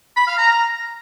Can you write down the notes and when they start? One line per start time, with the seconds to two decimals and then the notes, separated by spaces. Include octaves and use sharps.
0.16 B5
0.27 F5
0.38 A#5